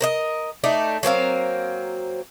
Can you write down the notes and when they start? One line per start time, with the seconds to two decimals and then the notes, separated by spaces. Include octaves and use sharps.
0.01 A#4 C5 D#5
0.64 A3 D#4 D5
1.03 F#3 A#3 C4 F5